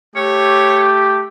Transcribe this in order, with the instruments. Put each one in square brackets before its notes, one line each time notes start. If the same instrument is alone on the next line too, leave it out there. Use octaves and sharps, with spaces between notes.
[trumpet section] A3 G4 [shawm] C#5